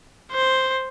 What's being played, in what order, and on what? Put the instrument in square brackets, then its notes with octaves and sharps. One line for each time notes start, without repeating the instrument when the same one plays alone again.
[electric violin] C5